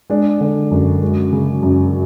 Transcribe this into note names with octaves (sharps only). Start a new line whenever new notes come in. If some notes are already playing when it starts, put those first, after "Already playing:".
G#3 D4
D3
F#2
G#3
C#3
F#2